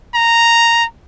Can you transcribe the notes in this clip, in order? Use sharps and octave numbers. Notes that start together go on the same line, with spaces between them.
A#5